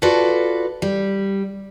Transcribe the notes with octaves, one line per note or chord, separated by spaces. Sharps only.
F4 F#4 A4 B4 D5
G3